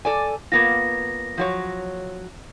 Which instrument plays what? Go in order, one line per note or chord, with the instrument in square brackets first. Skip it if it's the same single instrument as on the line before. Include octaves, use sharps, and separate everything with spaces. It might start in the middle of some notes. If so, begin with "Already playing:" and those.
[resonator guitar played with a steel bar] A4 D5 G#5
[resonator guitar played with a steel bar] A#3 B3 F4 [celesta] A#6
[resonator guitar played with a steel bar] F3 F#3 C#5